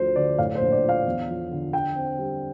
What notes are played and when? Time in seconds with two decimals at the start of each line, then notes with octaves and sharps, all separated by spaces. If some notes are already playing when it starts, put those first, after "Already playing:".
Already playing: D2 F3 C5
0.16 D3 D5
0.38 A2 F5
0.55 C5
0.61 A#1
0.72 D5
0.83 F3
0.89 F5
1.06 E2
1.28 F3
1.51 D3
1.73 D3 G5
1.95 C4
2.18 G3